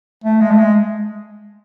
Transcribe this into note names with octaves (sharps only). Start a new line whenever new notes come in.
A3
G#3
A3
G#3